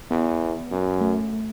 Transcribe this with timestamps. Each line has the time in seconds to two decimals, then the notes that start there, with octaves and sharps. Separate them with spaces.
0.11 E2 B3
0.71 F#2
1.01 A3